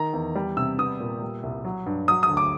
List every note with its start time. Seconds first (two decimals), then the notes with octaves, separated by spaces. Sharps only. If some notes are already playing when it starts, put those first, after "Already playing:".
Already playing: D#3 A#5
0.13 E2
0.35 G3
0.57 C3 E6
0.78 B3 D#6
1.00 A#2
1.22 G3
1.43 C2
1.65 F#3
1.86 G2
2.08 F#3 D#6
2.23 D#6
2.30 D2
2.37 D6